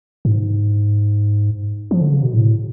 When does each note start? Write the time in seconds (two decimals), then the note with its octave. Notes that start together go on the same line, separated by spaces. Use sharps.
0.25 G#2
1.91 F3
2.01 D3
2.12 C#3
2.23 B2
2.34 A2